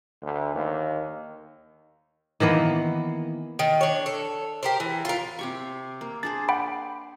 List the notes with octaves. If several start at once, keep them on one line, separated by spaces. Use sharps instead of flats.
D2
D#2
D#3 E3 A#3 B3
D#3
D4 C#5
A4
G4 A#4 C5
E3
F4 A#4
C3 G4 C#6
A#3
D4 G#4 C5 A6
F#5 G5 B5